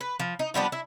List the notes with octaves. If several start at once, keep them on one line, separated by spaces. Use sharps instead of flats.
B4
F3
D#4
F3 G3 B3 D4
E4